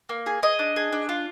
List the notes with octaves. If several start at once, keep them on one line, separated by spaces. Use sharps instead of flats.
A#3
G#4
G#4 D#5
D4
G#4
D4
F4